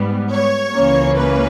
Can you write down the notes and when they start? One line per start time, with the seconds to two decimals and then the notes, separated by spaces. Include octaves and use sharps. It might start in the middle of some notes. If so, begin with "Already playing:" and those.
Already playing: G#2 G3 B3
0.31 C#5
0.74 C#2 C#3 E3 A#3 C#4
1.16 B4